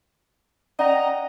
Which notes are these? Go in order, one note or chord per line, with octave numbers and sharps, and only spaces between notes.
C#4 D5 D#5 F#5 G5 A#5